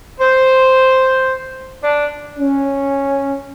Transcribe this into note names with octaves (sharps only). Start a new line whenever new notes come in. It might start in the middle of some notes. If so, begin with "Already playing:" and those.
C5
D4
C#4